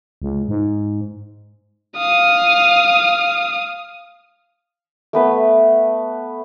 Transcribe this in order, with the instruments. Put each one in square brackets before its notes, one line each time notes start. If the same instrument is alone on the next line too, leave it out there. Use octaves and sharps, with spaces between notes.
[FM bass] C#2
G#2
[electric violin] F5 D#6
[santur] A3 B3 B4